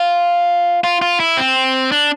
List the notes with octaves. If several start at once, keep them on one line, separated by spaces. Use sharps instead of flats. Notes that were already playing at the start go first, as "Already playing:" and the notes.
Already playing: F4
F4
F4
E4
C4
D4